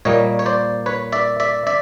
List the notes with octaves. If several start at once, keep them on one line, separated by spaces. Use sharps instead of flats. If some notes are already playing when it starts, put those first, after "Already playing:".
A#2 G3 A#3 C#5 D#5
C#5
C5 D5
B4 C#5
D5 E5
D5 E5
D5 E5